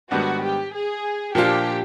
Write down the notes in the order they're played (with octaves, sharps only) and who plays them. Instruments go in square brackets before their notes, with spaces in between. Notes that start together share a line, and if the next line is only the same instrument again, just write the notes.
[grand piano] G#2 D#3 G3 B3 D4 [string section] F#4
[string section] G4
G#4
[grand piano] A#2 F3 A#3 D4 F4 [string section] G4